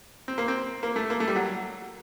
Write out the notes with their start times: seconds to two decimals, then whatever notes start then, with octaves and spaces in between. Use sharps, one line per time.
0.28 C4
0.38 A#3
0.48 C4
0.83 A#3
0.96 A3
1.10 A#3
1.20 A3
1.28 G3
1.36 F#3